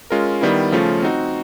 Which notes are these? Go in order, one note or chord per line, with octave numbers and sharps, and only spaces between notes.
G#3 C#4 F4 A#4
D#3 G3 B3 E4
C#3 F3 A3 C#4 F4
C4 D#4 F#4